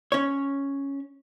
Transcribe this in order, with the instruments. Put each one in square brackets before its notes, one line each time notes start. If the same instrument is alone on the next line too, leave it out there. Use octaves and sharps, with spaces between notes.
[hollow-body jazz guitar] C#4 C#5